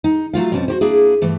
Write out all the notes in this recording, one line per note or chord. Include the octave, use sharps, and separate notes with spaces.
D#4
F#3 A3 F4 F5
F2 B2 C4 C#4 A5
F#4 G4 C5
A#3 D4 E4 G#4
G2 E3 A3